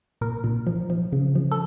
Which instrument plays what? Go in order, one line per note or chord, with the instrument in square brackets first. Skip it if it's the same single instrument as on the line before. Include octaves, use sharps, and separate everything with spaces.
[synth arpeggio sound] A#2 A#4
A#2
F3
F3
C#3
F3
A4